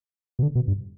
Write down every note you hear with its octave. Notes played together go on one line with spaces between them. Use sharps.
B2
D3
B2
G2